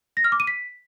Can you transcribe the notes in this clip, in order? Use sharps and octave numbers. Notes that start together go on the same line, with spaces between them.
A#6
F6
D6
D#7
B6